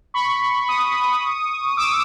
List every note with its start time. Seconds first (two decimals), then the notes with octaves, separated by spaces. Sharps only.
0.14 B5 C#6
0.68 C#6 D#6
1.77 D6 E6